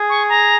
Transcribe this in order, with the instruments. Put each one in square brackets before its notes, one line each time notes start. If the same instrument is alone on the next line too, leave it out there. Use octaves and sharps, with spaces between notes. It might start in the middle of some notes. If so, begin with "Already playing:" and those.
Already playing: [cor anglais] G#4
[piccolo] C#6
A#5